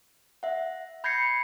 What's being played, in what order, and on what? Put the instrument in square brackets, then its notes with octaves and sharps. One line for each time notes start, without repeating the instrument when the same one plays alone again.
[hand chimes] E5 F#5
B5 G6 G#6 A#6 C7 C#7